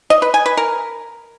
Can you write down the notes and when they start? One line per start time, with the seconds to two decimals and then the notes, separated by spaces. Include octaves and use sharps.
0.10 D#5
0.22 B4
0.34 G#5
0.46 B4
0.57 A#4